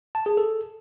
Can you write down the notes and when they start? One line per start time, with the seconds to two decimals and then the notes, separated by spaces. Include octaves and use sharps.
0.15 A5
0.26 G#4
0.37 A4